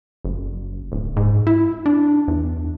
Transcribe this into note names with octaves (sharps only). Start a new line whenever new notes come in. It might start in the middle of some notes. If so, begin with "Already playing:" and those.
F#1
D1
G#2
E4
D4
E2